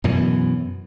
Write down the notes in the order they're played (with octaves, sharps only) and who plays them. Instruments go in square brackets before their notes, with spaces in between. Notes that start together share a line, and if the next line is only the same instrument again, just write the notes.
[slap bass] F#2 B2 E3